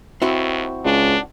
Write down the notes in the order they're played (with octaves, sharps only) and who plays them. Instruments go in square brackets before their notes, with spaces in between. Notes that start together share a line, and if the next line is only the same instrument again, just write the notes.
[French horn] D#2 [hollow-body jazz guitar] C4 E4 F#4
[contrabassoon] C#2 [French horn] D4